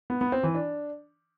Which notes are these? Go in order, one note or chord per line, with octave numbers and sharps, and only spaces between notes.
B3
B3
C4
E3
D4